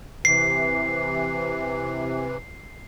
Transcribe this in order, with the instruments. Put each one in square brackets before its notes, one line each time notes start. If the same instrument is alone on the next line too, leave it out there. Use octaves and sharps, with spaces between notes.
[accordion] C3 E3 [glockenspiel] C7